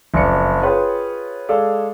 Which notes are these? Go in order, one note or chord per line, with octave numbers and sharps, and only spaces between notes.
F#1 F2 D5 C#7
F4 G#4 B4 C#5 G5
G#3 G#4 A4 D5 F5